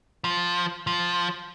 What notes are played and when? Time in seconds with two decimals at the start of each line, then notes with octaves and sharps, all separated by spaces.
0.25 F3
0.87 F3